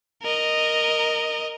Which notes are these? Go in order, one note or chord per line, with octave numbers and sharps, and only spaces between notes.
A#4 D#5